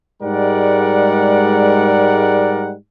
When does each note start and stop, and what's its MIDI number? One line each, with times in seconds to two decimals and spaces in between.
0.21 2.72 44
0.21 2.72 55
0.21 2.72 56
0.21 2.72 70
0.21 2.72 74
0.21 2.72 78